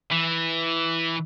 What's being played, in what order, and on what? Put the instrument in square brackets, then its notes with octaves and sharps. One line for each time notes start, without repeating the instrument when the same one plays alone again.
[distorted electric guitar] E3